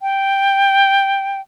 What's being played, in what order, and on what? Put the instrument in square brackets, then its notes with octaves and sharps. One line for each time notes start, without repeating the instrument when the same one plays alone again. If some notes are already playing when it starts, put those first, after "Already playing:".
[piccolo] G5